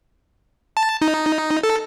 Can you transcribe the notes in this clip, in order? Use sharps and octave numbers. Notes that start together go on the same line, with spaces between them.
A5
D#4
A4